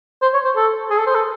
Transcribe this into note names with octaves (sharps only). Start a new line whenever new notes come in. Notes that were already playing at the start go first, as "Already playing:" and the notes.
C5
C#5
C5
A4
G#4
A4
C5
A4